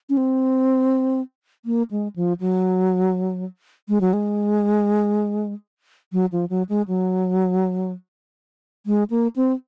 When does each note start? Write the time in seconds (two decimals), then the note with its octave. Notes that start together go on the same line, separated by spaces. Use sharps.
0.10 C#4
0.17 C4
1.65 A#3
1.91 G#3
2.16 F3
2.40 F#3
3.89 G#3
4.01 F#3
4.13 G#3
6.13 F#3
6.32 F3
6.50 F#3
6.69 G#3
6.88 F#3
8.86 G#3
9.10 A#3
9.36 C4